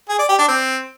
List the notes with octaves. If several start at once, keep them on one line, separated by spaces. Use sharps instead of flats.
G#4
D5
G4
D4
C4